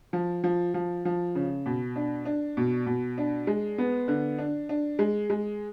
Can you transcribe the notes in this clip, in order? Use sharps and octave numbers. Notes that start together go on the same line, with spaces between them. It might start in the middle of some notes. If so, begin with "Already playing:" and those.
F3
F3
F3
F3
C#3
B2
D4
D4
B2
B2
D4
G#3
B3
D3
D4
D4
G#3
G#3